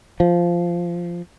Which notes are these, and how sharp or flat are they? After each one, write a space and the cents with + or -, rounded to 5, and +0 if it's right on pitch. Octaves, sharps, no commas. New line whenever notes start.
F3 -10